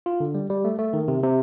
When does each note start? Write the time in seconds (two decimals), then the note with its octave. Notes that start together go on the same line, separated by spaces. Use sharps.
0.06 F4
0.20 D3
0.34 G3
0.50 G3
0.64 A3
0.79 A3
0.93 D#3
1.08 C3
1.23 C3